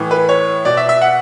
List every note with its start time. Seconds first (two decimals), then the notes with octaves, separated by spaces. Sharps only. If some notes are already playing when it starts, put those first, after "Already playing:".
Already playing: A2 E3
0.11 B4
0.29 C#5
0.65 B2 D5
0.77 E5
0.89 E5
1.02 F#5